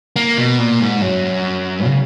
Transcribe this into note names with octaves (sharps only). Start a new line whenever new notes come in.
A#3
B2
A#2
G#2
F#2
C#3